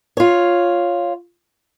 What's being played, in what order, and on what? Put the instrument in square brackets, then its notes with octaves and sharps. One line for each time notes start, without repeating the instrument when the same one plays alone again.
[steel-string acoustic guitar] F4 C#5